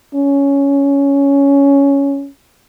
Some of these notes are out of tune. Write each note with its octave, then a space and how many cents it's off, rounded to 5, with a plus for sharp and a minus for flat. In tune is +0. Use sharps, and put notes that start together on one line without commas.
C#4 +10